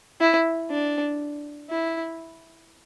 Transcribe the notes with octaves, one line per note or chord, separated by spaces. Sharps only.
E4
D4
E4